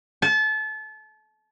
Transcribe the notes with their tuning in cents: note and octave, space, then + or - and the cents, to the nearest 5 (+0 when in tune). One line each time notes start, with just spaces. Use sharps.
A5 -30